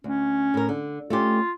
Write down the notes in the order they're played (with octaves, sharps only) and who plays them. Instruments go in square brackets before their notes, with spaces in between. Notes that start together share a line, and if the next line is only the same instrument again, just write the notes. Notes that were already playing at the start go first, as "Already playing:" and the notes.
[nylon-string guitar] D2 [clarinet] C#4
[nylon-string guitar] A2 A#4
D3
[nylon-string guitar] A3 C#4 G4 [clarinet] F4